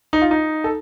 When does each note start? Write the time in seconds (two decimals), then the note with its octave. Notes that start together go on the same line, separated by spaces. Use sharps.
0.13 D#4
0.22 F4
0.31 D#4
0.64 A4